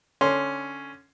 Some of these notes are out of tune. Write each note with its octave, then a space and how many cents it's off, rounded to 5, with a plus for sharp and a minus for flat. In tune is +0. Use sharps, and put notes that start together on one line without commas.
D3 +5 C#4 +0 C6 +0